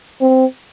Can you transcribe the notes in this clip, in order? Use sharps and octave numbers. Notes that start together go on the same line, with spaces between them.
C4